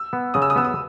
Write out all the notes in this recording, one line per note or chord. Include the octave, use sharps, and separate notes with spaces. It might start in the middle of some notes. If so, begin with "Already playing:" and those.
Already playing: E6
B3
C#3 D#6
E6
D#6
B3 E6
D#6